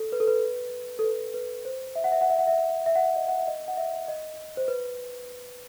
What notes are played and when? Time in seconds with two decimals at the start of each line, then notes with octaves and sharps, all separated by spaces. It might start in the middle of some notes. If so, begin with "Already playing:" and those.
Already playing: A4
0.12 B4
0.20 A4
0.27 B4
0.99 A4
1.04 B4
1.34 B4
1.65 C5
1.96 E5
2.04 F#5
2.12 E5
2.21 F#5
2.30 E5
2.39 F#5
2.47 E5
2.86 E5
2.96 F#5
3.05 E5
3.16 D#5
3.28 F#5
3.38 E5
3.48 D#5
3.68 F#5
3.77 E5
4.08 D#5
4.57 C5
4.68 B4